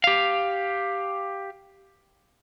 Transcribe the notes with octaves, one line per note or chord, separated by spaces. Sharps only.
G4 F5